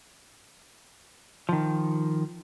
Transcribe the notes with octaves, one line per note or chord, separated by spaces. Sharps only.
D#3 F3